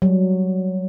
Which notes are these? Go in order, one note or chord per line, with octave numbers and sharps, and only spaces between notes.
F#3 G3